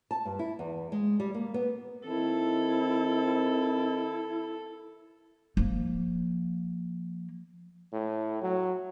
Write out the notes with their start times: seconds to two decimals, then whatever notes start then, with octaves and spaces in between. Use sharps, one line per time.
0.11 A5
0.25 G2
0.39 E4
0.59 E2
0.92 G#3
1.20 G3
1.34 A#3
1.54 B3
2.05 D#3 C4 E4 A4
5.57 F3 A#3
7.93 A2
8.43 F#3